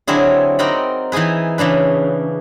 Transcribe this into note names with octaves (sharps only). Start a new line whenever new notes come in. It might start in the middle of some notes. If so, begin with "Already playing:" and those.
D3 F#3 C4 D4 E4 G#4
C4 D#4 A#4 D5 F#5 B5
E3 D#4 E4 G#4 B4
C#3 E3 D4 B4